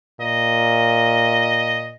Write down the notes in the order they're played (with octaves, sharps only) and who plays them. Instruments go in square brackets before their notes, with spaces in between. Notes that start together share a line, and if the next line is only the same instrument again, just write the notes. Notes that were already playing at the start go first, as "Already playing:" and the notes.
[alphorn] A#2 [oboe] D#5